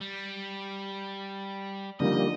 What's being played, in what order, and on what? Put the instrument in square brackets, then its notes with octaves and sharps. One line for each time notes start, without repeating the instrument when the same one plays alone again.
[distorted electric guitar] G3
[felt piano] D3 F3 D#4 [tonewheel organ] G3 A#3 [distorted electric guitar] D#5